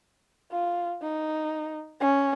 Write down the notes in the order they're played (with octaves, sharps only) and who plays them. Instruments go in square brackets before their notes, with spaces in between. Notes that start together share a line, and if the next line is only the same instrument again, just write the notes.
[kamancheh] F4
D#4
C#4